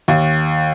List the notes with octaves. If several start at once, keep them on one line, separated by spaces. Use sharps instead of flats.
D#2